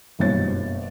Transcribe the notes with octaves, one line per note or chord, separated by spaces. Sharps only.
F#1 G2 B2 C#5 A6